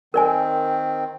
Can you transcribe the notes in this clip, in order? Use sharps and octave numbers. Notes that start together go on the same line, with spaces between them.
D#3 C4 A#4 D5 G#5